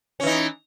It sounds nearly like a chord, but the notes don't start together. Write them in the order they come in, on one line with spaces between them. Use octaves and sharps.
C#4 E3 D#4